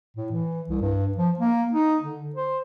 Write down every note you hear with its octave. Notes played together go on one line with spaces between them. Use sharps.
A2
E3
C2
G2
F3
A#3
D#4
D3
C5